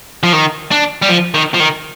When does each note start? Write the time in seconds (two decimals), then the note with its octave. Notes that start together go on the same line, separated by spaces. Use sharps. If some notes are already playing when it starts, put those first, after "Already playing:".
0.23 F3
0.33 D#3
0.71 D4
1.02 G3
1.09 F3
1.35 D#3
1.54 F3
1.60 D#3